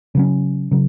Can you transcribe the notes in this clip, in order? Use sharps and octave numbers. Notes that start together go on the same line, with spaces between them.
C#3 F#3 C#4
C#3 F#3